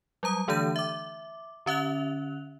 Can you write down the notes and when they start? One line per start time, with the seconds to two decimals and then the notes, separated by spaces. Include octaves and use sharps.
0.23 F#3 G3 A#5 D#6
0.48 D3 E3 A3 D4 G6 D#7
0.76 E5 D6
1.66 D3 C#4 E5 F#6 F7